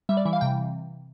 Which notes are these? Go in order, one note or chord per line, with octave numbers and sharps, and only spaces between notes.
G3 E5
D5
E3 E5
F5
C3 G5